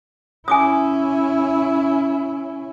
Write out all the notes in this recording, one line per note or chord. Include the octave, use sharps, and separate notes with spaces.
C#4 E4 G#5 D6 D#6